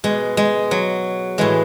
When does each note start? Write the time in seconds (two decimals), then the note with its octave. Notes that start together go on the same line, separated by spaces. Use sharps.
0.04 B2 G#3
0.37 G#3
0.71 F#3
1.38 A2 E3 G#3